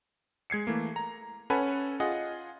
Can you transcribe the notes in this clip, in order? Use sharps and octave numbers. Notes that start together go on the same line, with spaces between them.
G#3 G#6 C7 C#7
E3 A3 A#3
A#5
C#4 A4 B4 F#5 G#5 B5
F4 G#4 D#5 F#5